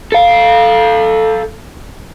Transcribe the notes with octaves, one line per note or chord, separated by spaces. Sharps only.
A4 F5